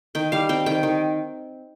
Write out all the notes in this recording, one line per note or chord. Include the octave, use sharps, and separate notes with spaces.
D#3 G5
G3 F5
C4 G5
D#3 G5
D#3